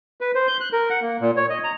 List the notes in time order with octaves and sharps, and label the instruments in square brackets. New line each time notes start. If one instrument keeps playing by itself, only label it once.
[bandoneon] B4
C5
G6
F#6
A#4
F#5
A#3
A#2
C#5
D#5
A#5